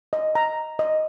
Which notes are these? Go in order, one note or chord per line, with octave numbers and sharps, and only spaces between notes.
D#5
A#5
D#5